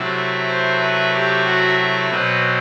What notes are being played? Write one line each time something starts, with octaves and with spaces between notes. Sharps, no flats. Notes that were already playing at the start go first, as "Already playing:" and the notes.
Already playing: C3 F#3 A3 E4
C5
B4
G4
F#4
B2 F#3 C4 B4